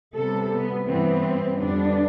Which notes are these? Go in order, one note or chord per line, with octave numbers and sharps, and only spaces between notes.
C3 G3 B3 A4
B3
G2 E3 B3 C4
F2 D3 G3 B3 D4